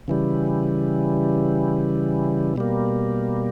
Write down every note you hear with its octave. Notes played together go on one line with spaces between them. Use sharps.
C#3 E3 G3
B2 G3 A#3